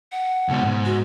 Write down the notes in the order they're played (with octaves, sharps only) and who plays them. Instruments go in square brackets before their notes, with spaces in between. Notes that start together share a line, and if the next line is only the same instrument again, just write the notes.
[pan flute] F#5
[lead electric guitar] C#2 B2
G#2
[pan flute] F#4